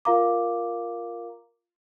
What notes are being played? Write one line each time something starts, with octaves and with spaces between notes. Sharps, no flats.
F4 A#4 F5 A#5 D6